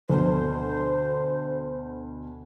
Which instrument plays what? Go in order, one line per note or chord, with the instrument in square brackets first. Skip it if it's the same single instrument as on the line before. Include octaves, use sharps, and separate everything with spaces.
[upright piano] D2 B2 [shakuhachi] C5